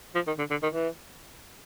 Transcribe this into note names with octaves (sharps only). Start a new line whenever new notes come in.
F3
D#3
D3
D3
D#3
E3